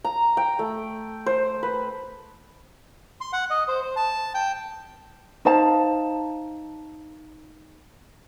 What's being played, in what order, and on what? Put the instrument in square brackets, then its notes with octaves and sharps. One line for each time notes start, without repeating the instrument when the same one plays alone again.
[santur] A#5
G5
A3
C5
B4
[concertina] C6
F#5
D#5
C5
C5
A5
G5
[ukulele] D#4 C5 F5 A5